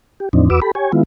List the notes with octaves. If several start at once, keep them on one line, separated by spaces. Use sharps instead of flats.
G4
E2 A2 F3 C4 D4 D#4
E2 F#4 B4 D6 E6
G4 A4 B5
G4 C#5 G#5
D#3 G#3 B3 E4 F4